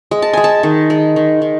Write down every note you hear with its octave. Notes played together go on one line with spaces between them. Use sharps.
G#3
A5
G#3 G#5
A5
D#3
G#3
D#3
D#3